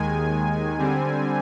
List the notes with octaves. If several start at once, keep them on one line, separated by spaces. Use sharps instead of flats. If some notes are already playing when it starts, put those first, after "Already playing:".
Already playing: D#2 D#3 G#3 G#5
D3 G3 C4